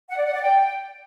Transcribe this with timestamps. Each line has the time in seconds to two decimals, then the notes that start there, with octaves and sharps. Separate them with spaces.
0.10 F#5
0.18 D5
0.26 F#5
0.34 D5
0.42 G5